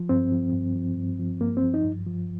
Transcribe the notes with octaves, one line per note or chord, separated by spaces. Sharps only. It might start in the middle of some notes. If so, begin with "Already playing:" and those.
Already playing: F3
G2 C4
F3
G2
F3
G2
F3
G2 A#3
C4
F3
D#4
G2
F3